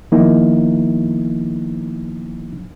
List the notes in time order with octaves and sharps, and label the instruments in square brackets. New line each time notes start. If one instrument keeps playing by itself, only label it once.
[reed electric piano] D#3 F3 A#3 B3 D#4 E4